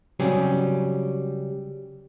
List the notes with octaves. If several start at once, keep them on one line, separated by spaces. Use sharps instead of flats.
C#3 F#3 G3 C4 C#4 G#4